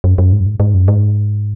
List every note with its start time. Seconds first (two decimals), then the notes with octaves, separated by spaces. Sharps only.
0.04 F#2
0.18 F#2
0.33 G#2
0.40 F#2
0.46 G#2
0.60 G#2
0.74 F#2
0.88 G#2